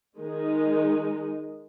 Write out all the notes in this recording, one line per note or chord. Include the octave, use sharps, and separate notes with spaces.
D#3 G#3 D#4 G#4